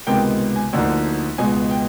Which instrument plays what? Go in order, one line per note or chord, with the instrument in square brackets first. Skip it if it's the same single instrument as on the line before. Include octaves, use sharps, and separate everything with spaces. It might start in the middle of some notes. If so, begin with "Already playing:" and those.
[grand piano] C#2 C3 D#3 G#3 B3 G5
G#5
D2 D3 F3 A#3 D#4
C#2 B2 G#3 G#5
G5